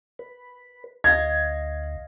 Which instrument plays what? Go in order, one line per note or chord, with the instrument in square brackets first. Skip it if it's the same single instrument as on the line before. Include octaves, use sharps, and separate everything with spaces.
[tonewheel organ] B4
[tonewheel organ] D2 [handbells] D#5 F5 [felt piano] G#6